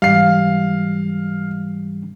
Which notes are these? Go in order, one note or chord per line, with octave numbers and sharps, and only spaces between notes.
G#2 E3 G3 F5 C7